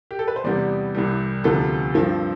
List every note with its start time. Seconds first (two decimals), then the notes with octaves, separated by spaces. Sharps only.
0.11 G4
0.19 A4
0.28 B4
0.36 C5
0.44 E2 C3 G3 B3 D5
0.95 C2 C3 E3 G3
1.44 D2 C3 F3 B3 A4
1.94 G2 F3 C4